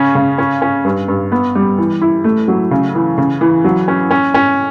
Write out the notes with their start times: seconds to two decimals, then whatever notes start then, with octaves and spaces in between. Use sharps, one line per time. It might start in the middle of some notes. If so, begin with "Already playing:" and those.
Already playing: C#3 C#4
0.15 C#3
0.38 C#4
0.62 C#4
0.84 G2
1.08 G2
1.32 B3
1.55 G3
1.78 E3
2.01 E4
2.24 A3
2.48 F#3
2.71 C#3
2.95 E3
3.18 C#3
3.41 E3
3.64 F#3
3.88 C#4
4.11 C#4
4.34 C#4